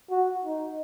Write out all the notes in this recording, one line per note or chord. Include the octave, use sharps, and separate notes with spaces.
F#4
D#4